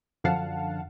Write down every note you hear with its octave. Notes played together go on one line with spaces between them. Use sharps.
F#2 D3 F3 F5 F#5 A5